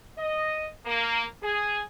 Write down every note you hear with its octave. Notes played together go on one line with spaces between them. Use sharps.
D#5
A#3
G#4